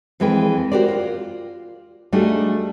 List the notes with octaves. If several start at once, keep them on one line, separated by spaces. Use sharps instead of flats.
F2 E3 G#3 B4 G5
F#4 G4 A#4 C5 D5
F4
G3 A3 D4 D#4 F#4 G#4